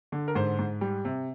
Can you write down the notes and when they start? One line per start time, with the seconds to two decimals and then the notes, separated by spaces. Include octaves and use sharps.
0.12 D3
0.28 A#4
0.35 G#2 C5
0.58 G#2
0.81 G3
1.05 C3